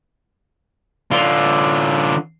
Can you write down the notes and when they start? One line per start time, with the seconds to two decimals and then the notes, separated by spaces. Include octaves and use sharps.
1.11 D3 F4